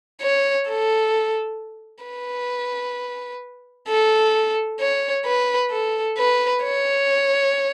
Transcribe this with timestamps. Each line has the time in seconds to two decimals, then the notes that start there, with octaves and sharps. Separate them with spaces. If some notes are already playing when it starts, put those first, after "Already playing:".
0.22 C#5
0.68 A4
2.04 B4
3.88 A4
4.80 C#5
5.25 B4
5.71 A4
6.18 B4
6.63 C#5